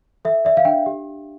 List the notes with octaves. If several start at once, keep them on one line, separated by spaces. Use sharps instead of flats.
A4 E5
D5 E5
F5
D4 G5
G4